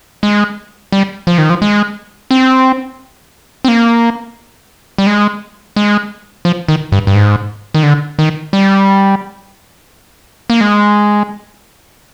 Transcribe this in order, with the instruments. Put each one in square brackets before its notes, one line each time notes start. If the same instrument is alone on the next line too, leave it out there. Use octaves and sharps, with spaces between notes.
[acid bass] G#3
G3
F3
D#3
F3
G#3
C4
C4
A#3
G3
G#3
G#3
F3
D#3
G2
G2
G#2
D#3
D3
D#3
G3
A#3
G#3